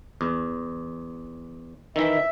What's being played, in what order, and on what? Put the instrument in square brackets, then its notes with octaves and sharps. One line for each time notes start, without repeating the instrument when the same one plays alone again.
[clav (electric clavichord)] E2
[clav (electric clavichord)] D#3 E3 [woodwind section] E5